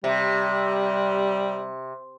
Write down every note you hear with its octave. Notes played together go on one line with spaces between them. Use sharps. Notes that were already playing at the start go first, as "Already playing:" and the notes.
C3 G3